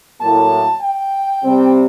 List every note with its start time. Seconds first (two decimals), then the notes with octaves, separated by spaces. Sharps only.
0.21 A2 F#3 A#3 A5
0.82 G5
1.43 C3 G3 C4